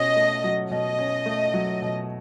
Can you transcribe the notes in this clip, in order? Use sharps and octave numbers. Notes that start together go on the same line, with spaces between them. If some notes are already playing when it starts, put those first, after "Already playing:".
Already playing: B2 C#4 D#5
A3
F#3
B2 D#5
C#4
A3
F#3
B2